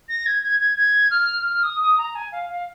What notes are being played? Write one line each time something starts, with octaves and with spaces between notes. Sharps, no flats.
A#6
G#6
G#6
G#6
G#6
F6
F6
D#6
D#6
A#5
G#5
F5
F5